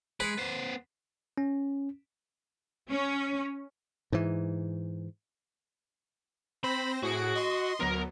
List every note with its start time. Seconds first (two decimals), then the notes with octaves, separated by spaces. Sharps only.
0.20 G#3 B4
0.38 B3 C5
1.38 C#4
2.92 C#4
4.12 G#2 E3
6.63 C4 C5 B5 A#6
7.03 A2 F#4 G#4 D7
7.35 D#5 C6
7.80 D2 F#3 B3 A#4